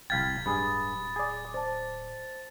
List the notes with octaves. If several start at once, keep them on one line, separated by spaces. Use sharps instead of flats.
D1 C2 F5 G5 G#6 A6 B6
G2 G#4 B5 D#6
G#4 D5
C5 D5 A5